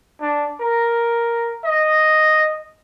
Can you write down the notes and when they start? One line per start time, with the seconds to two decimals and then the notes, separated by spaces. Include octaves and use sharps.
0.21 D4
0.60 A#4
1.64 D#5